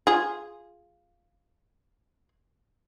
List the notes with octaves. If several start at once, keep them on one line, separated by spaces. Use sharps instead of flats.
F4 G#4